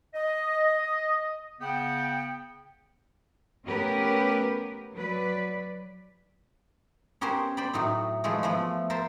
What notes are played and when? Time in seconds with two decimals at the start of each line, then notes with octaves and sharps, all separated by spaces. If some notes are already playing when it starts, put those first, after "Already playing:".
0.14 D#5
1.61 C#3 B3 F#5 G5
3.66 A3 B3 C#4 G4 A#4 B4
4.95 F#3 B4 D5
7.21 B3 C#4 G4 A#4 C5
7.57 C5 D5 G5 B5
7.73 A2 F#3 D#4
8.24 E3 F3 G#3 A3
8.43 F3 A3 B3
8.90 A#4 C5 E5 A5